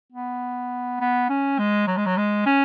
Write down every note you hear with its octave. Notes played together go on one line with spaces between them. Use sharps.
B3
B3
C#4
G#3
F#3
G#3
F#3
G#3
C#4